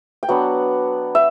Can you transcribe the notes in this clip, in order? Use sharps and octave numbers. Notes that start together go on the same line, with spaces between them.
G5
F#3 B3 D4 F#5
E5